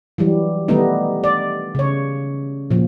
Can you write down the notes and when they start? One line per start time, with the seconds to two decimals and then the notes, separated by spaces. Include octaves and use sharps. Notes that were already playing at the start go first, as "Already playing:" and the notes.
0.18 E3 F#3 G3
0.68 D#3 G3 A3 B3 D#4
1.24 D5
1.75 C#3 C#5
2.70 A#2 F3